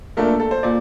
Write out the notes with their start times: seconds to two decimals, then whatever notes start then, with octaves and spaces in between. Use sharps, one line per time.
0.17 A#2 A3 D4 A#4
0.28 A4
0.40 A4
0.51 C5
0.63 A#2 D5